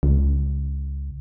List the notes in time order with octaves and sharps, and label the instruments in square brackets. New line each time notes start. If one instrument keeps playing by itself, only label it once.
[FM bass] C#2